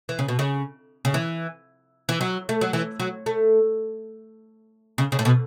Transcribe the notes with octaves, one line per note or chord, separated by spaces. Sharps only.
E3
C#3
B2
C#3
C#3
E3
E3
F#3
A3
F#3
E3
F#3
A3
C#3
C#3
A2
B2